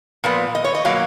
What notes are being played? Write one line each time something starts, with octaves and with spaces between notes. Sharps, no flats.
A#2 F3 B3
D#5
C#5
D#5
B2 F#3 A#3 F5